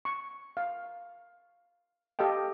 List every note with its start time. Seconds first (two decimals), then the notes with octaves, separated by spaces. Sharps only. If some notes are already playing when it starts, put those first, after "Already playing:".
0.05 C#6
0.57 F5
2.19 G4 A4 D#5 F5 G5